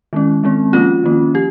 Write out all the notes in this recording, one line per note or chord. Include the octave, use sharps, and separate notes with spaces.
D#3 G#3 C#4
D#3 G#3 C4
F3 A#3 C#4 F4
D#3 A#3 C#4
F3 G4